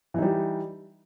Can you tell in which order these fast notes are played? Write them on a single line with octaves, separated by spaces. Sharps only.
E3 D#4 G3